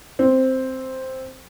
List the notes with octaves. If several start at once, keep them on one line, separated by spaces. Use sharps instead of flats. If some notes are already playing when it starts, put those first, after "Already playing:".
C4